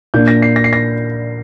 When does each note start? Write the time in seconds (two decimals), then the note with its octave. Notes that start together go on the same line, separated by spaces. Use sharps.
0.14 A#2 A#3 D4 G6
0.28 A#6
0.42 C7
0.56 A#6
0.64 C7
0.73 A#6